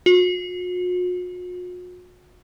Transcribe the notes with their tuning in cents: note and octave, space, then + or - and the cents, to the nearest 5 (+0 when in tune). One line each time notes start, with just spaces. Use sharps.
F#4 -45